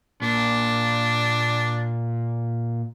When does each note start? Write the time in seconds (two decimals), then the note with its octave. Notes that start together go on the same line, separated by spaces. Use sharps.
0.22 A#2 D4